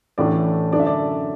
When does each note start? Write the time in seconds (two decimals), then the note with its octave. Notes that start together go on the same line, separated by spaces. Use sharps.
0.18 A1 A2 E3 A3 D4 D5
0.72 F#2 D3 A3 D4 D5
0.80 E5
0.87 D5